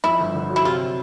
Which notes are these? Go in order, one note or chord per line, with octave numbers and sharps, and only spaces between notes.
F2 E4
G1
D3
F#3
E4
C3 F4